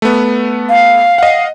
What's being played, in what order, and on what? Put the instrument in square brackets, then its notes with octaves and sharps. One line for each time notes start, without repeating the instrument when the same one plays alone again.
[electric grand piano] A3 B3
[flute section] F5
[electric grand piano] D#5 F#5